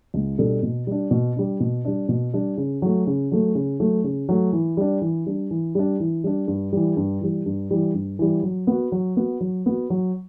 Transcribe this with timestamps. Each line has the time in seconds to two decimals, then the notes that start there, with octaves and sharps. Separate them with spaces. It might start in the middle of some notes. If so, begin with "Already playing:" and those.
0.14 C#2
0.38 B2 G3 D4 A4
0.63 B2
0.87 G3 D4
1.11 B2
1.36 G3 D4
1.60 B2
1.85 G3 D4
2.09 B2
2.34 G3 D4
2.57 C#3
2.82 F#3 A3
3.07 C#3
3.32 F#3 A3
3.55 C#3
3.80 F#3 A3
4.04 C#3
4.29 F#3 A3
4.53 E3
4.77 G3 D4
5.02 E3
5.26 G3 D4
5.51 E3
5.75 G3 D4
6.00 E3
6.24 G3 D4
6.48 G2
6.72 E3 G3
6.97 G2
7.21 E3 G3
7.46 G2
7.71 E3 G3
7.94 G2
8.19 E3 G3
8.43 F#3
8.67 B3 F#4
8.92 F#3
9.17 B3 F#4
9.41 F#3
9.66 B3 F#4
9.90 F#3